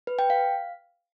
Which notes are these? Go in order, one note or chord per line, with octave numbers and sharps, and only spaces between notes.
B4
G5
F5